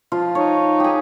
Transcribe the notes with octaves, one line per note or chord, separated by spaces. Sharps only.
F3 F4
D#4 C#5
G4 G#4